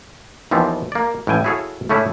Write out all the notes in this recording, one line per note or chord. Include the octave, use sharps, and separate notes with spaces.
D#2 E3 F3 B3 C4
A#3 D5
A1 A2 G5 G#5
E4 F#4 G#4 A4 C#5 F5
A2 C#3 A3 C#4 D4 E4